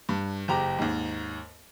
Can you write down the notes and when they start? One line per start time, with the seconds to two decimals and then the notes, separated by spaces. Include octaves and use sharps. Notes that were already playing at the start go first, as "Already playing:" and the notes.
0.09 G2
0.48 F#1 G4 A#5 D6
0.79 D#2 G#2